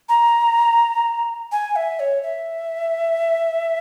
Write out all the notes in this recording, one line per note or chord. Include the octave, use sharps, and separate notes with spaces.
A#5
G#5
E5
C#5
E5